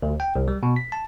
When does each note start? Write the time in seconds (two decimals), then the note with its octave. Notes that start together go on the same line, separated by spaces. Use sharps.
0.02 D2
0.20 G5
0.36 C2
0.48 G3
0.63 B2
0.76 B6
0.92 A5